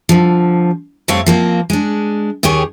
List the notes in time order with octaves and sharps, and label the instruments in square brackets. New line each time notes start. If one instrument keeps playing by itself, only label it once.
[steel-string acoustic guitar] D3 F3
F2 G3 A3 C4 C#5 F5
F3 A#3 C4
G#3 D4
D#2 D#3 G4 G#4 C#5